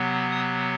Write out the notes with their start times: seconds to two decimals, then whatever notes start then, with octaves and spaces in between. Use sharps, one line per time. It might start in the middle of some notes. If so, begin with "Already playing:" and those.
Already playing: C3 F#3 B3
0.32 D#6